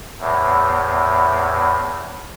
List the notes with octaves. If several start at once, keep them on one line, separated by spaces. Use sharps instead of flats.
E2 A2